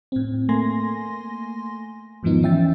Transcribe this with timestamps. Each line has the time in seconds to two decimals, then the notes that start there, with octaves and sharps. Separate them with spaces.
0.12 A2 C4
0.49 A3 A#3 G#5 C6 A#6
2.23 E2 G#2 D#3 F3 B3 D#4
2.42 E3 C#4 E5 G5 A6